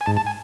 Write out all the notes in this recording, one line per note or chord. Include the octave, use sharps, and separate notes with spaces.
G#5
G#2 A5
A5
G#5